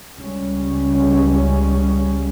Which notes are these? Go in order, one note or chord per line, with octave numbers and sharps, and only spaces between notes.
C#2 C#3 G3 C#4